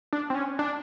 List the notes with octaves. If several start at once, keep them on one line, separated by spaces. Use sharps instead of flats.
D4
C4
C#4
D4